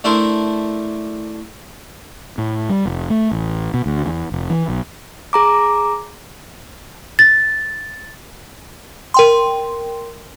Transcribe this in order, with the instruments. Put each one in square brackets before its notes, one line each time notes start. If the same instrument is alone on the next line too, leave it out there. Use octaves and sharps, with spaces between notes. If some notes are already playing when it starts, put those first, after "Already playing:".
[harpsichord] A3 D4 E4 A#4 C5
[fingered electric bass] A2
G3
F1
A3
A1
B2
D2
E2
F1
E3
B1
[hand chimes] G#4 A#5 D6
[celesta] A6
[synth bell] A#4 G5 C6